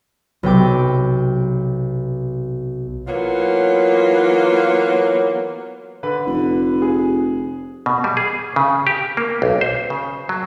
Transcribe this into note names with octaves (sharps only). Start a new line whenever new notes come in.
B1 C3 G5 D6
E3 F#3 A#3 B3 F4
D3 B4 B5
F1
G#4
B2
G3
G#4
C#3
G4
A#3
B1
C5
C#3
F#3